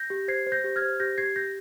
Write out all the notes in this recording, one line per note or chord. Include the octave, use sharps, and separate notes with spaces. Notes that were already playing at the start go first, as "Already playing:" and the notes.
Already playing: G6 A#6
G4
C5 G#6 C7
C5
G6 A#6
G4
F6 G#6
C5
G4 G6 A#6
G4 G#6 C7
G4 G6 A#6